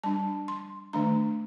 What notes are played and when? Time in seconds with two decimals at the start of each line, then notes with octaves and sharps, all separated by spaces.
0.03 G3 D4 A5
0.48 C6
0.93 D#3 A3 D4 A#5